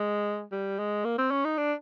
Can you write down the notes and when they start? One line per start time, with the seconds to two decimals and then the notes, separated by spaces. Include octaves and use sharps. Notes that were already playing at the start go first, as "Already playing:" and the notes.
Already playing: G#3
0.52 G3
0.79 G#3
1.05 A#3
1.18 C4
1.31 C#4
1.45 D#4
1.58 D4